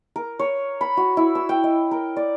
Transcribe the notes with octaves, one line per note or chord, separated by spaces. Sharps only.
A#4
C#5
B5
F#4
E4
E6
G5
D#5
A#4
D5